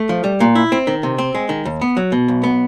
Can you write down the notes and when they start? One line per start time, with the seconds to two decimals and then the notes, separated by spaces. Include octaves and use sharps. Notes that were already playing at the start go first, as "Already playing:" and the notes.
Already playing: A3
0.09 F3
0.24 G3
0.40 A#2
0.55 E4
0.72 C4
0.87 D#3
1.03 C3
1.18 C4
1.34 G#3
1.49 D#3
1.65 D#2
1.81 B3
1.97 F#3
2.12 B2
2.28 B1
2.43 B3